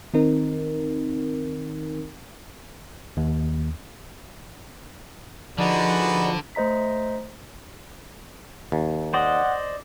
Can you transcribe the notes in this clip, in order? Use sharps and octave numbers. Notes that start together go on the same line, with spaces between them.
D#3 C4 D#4 A#4
D#2
D3 F3 D#4 F#4 G#4 B4 D5
A3 C5 D#5 A#5 B6
D#2
C5 D5 D#5 F#5